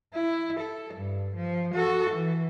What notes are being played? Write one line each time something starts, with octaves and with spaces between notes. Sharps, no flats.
E4
A4
G2
F3
F#4 A4
E3